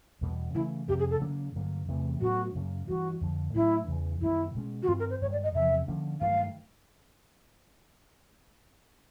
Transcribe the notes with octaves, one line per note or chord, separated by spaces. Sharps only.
E2 B2 G3 B3
C#3 E3 A3 E4
F2 C3 D#3 G4
G#4
A4
C#3 F#3 A#3 D4
G2 D3 F#3 A#3
E2 C3 E3 A3
A2 F#3 B3 D4 F#4
F#2 C#3 F#3 A#3
G2 E3 G3 F#4
F2 D3 F3
A2 F#3 A#3 D4 E4
E2 C#3 E3
F#2 D#3 G3 B3 E4
B2 G#3 C#4
F#4
G2 D#3 G3 C4 F4
A#4
C5
G2 D#3 G#3 C#5
D5
D#5
E2 C3 F3 E5
D3 F3 A#3 C#4
G2 D#3 F#3 A3 F5